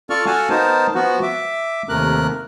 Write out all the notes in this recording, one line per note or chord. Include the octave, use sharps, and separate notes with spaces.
F4 A4 D5 C#6 F6
F#4 A4 F5 F#5 G#5 A5
B3 D#4 A#4 C5 A5
F3 B3 F#4
E5 D6
D#2 C3 A3 A#4 F#6